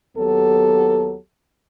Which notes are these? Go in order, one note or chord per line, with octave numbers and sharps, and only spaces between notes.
D#2 F#3 B3 G4 A4